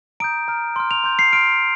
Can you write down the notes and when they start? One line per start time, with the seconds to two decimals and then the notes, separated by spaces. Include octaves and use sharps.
0.20 A#5 D#6 G6 D7
0.48 A#5 F6
0.76 C6 F6
0.91 F7
1.04 C6 G6
1.19 C7
1.33 C6 F6 D7